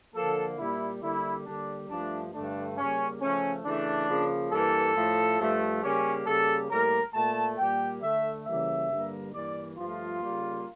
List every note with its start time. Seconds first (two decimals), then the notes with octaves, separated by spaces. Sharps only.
0.15 D3 F3 A#3 A4
0.58 A#2 G3 A#3 E4
1.02 D3 G3 A#3 E4
1.46 D3 G3 A#3 D4
1.89 G2 F3 A3 D4
2.34 G2 D3 A3 D4
2.77 C#3 G3 A#3 C#4
3.21 C#3 F3 A3 C#4
3.65 C#3 E3 A3 D4
4.09 C#3 F3 A#3
4.52 G2 E3 A#3 A4
4.96 A2 F3 A3
5.40 G2 F3 A3
5.83 C#3 G3 A#3 C#4
6.27 C#3 G3 A#3 A4
6.71 A2 G3 A#3 A#4
7.14 A#2 A3 A5
7.58 A#2 G3 A#3 G5
8.02 D3 A3 E5
8.46 C#3 E3 G3 A#3 E5
8.89 G2 D3 G3 A#3
9.33 G2 E3 A#3 D5
9.77 G2 F3 A3 F4
10.21 C#3 G3 A#3